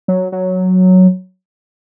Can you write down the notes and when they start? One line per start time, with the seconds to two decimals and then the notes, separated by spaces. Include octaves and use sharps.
0.08 F#3
0.32 F#3